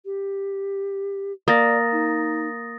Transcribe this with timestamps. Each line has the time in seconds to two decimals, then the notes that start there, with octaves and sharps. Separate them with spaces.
0.05 G4
1.48 A#3 D5 D#6 A6 A#6
1.92 D#4